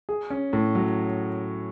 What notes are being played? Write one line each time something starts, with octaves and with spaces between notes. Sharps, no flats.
G#4
C#4
A2
F#3